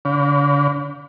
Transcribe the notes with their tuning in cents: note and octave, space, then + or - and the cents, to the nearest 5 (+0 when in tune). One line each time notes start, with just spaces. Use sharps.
D3 -45